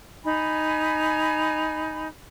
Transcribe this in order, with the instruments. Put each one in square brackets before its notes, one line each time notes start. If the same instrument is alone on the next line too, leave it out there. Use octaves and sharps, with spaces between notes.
[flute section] D#4 G#5 B5